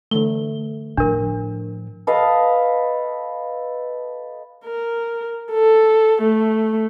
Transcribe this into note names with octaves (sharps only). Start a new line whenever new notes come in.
D3 E3 A3 G7
A2 F3 D4 A#4
A4 B4 D#5 F5
A#4
A4
A3